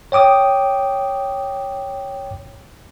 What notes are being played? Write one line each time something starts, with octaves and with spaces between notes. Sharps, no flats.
C#5 G5 D6 D#6